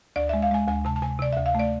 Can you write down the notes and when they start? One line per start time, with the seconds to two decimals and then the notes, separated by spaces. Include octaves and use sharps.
0.16 D2 D5
0.29 G#3 E5
0.42 F5
0.51 G#3 G#5
0.68 D2 G#5
0.85 C3 A5
0.96 A5
1.02 C3 G#5
1.19 C3 D5
1.33 D2 E5
1.46 F5
1.55 A3 D5